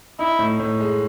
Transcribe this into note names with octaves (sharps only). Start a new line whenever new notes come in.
D#4 E4
A2
A2
G#3